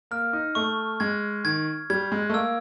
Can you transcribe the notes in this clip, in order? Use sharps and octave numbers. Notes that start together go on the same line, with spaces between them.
A#3 F6
D#4
A3 C#6
G#3 G#6
D#3 G#6
G3 G#6
G#3
A3
A#3 E6